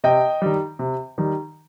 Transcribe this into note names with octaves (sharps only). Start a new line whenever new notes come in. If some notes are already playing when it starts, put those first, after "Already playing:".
C3 D#5 G5
D#3 G3
C3
D#3 G3